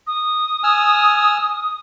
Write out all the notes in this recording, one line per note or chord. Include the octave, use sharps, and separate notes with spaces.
D#6
G#5 E6 F6